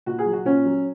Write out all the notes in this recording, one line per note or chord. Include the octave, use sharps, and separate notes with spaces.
A#2 F#4
G#4
F#3
F#4
A#2 C#4
F#3